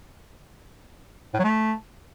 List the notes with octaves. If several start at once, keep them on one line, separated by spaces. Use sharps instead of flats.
A2
F#3
A3